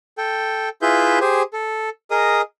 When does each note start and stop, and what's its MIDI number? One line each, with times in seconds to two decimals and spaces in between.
0.18 0.69 69
0.18 0.69 79
0.82 1.19 64
0.82 1.19 65
0.82 1.19 68
0.82 1.19 71
0.82 1.19 76
0.82 1.19 91
1.21 1.43 67
1.21 1.43 68
1.21 1.43 72
1.21 1.43 80
1.53 1.89 69
2.11 2.42 68
2.11 2.42 70
2.11 2.42 75
2.11 2.42 87